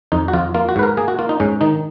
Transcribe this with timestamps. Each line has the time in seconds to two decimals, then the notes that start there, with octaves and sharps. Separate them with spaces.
0.12 F2 D#4
0.28 F#4
0.33 F2 F4
0.54 A#3 F4
0.69 F#4
0.76 G#2 B4
0.83 A#4
0.97 A#3 G#4
1.08 F#4
1.19 A#3 F4
1.29 D#4
1.40 G#2 C#4
1.61 D#3 D#4